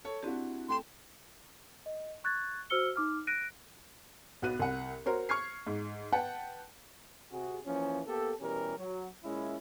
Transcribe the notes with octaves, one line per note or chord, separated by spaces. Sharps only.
A4 C#5
C4 D4 E4 F#4 G4
A3 G5 C6 E7
D#5
C#6 F#6 G#6 A6
F#4 C5 E6 F6 C#7 G7
D#4 D6 F6
F#6 A#6 D7 D#7
B1 B3 F#4 F#6 D#7
C2 F#5
F#4 A#4 C5 C#5
C#6 F6 G#6 C7
G#2
B4 F#5 G5 A5
C3 F#4 G#4
E3 F3 A#3 C#4
A#3 B3 G4 A4
B2 E3 G3 C#4 G4 A#4
F#3
A#2 G#3 C#4 E4